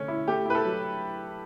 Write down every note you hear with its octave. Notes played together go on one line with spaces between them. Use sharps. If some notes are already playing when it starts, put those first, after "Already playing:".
Already playing: D3 A3 C#4
E4
A3 G4
E4 B4
A4
F#3